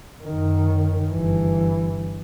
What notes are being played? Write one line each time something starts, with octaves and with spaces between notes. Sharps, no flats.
F#2 D#3
G1 E3